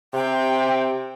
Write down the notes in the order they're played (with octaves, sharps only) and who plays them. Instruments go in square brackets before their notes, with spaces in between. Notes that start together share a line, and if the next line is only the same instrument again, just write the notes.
[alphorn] C3 [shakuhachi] G5